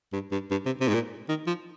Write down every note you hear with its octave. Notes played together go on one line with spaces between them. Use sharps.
G2
G2
G2
C3
C3
G#2
A#2
D#3
F3